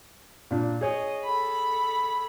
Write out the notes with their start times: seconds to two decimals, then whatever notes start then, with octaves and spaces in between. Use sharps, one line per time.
0.51 A#2 D4
0.81 G#4 C#5 D#5
1.24 A4 B5